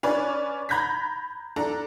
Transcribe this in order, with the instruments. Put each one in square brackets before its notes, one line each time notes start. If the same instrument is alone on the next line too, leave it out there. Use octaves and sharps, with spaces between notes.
[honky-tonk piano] C#4 D4 B4 D5
A#5 B5 G6 G#6 A#6 B6
D4 A4 A#5